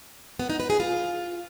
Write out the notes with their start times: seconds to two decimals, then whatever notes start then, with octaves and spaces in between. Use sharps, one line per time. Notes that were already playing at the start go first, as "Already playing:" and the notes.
0.39 B3
0.50 D#4
0.60 B4
0.70 G#4
0.80 F4